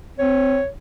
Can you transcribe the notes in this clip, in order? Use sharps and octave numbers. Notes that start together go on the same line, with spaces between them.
C4 C#5